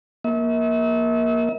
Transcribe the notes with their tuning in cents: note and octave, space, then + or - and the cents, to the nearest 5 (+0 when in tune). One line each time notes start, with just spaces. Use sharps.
A#3 +15 E5 -40